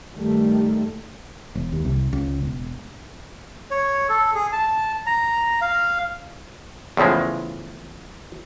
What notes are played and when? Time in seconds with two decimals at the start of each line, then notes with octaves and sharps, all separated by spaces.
0.15 G2 D#3 G3 A3
1.55 E1
1.73 D#2
1.85 C2
2.13 C#2
2.43 E1
3.71 C#5
4.09 A4
4.35 G#4
4.52 A5
5.06 A#5
5.61 F5
6.97 E2 A2 C#3 F3 G#3